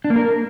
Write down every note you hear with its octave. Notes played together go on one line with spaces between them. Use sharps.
D4
A#3
A#4